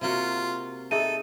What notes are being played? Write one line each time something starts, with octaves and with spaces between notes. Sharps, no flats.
C3 A#3 F4 F#4
D#4 G#4 A4 E5 D#7